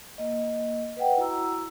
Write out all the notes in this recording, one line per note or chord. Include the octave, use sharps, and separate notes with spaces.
A#3 D#5
B4 D#5 F#5 G5
E4 F#4 A#5 E6